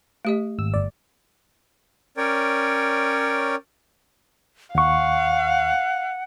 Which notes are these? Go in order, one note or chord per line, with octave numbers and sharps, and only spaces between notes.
A3 G4 D#5
G#1 E6
G1 D5
C#4 A#4 C#5 D5 G5
D#2 F5 F#5 C#6